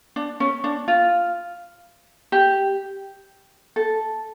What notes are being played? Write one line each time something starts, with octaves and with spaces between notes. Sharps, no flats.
D4
C#4
D4
F4
G4
A4